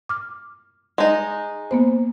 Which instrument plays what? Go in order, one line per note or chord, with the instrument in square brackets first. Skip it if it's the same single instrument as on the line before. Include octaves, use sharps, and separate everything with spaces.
[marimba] D6 F6
[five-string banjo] G#3 D#4
[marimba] A#3 B3 C5